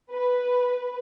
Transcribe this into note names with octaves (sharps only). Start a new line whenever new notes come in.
B4